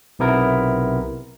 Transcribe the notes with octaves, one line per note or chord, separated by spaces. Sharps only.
B1 C3 B3 E4 A#4